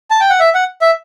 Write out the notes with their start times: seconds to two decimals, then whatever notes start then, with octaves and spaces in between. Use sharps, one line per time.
0.11 A5
0.20 G5
0.30 F#5
0.40 E5
0.54 F#5
0.81 E5